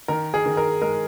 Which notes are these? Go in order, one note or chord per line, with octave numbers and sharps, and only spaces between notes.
D#3 A#4
G#4
D#3
A#4
G#3 A#4